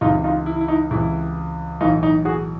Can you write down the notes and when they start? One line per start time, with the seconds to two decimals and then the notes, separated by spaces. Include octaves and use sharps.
0.01 C#2 C3 E3 D#4 F4
0.24 D#4 F4
0.46 E4
0.61 E4
0.68 D#4
0.91 C#2 C3 E3 E4
1.80 B1 A2 E3 D#4 F4
2.03 D#4
2.25 F#4 G#4